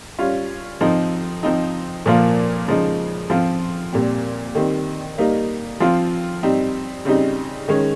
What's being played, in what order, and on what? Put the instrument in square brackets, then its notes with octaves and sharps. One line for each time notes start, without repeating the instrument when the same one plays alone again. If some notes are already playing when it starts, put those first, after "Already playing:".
[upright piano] G3 C#4 F4
F3 C4 D#4
F3 C4 D#4
A#2 F3 A#3 F4
C#3 F3 G#3 D#4
F3 C4 F4
A#2 G3 C4
D#3 G3 C4
G3 A#3 D#4
F3 C4 F4
G3 C4 D#4
C#3 G3 C4 D#4
D#3 G#3 C#4